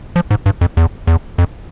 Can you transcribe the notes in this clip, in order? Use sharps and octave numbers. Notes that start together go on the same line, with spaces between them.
F3
G#2
G2
F2
E2
E2
F2